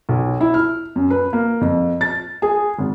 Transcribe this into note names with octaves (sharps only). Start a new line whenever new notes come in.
B1
E4
F6
F#2
B4
A#3
F2
A6
G#4
G#1